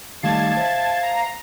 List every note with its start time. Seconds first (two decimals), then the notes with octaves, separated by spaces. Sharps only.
0.23 D#3 G3 A3 F5 A5 G#6 A6
0.57 C5 E5
1.03 A#5